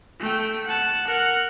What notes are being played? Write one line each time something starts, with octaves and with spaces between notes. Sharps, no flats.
A3 G5
F#5 A5
A#4 F#5